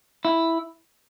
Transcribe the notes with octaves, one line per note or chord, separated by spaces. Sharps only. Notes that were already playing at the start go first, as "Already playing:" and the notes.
E4